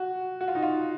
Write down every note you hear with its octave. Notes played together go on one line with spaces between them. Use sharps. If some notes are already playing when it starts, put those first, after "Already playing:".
Already playing: F#4
F#4
F4
D#4
F4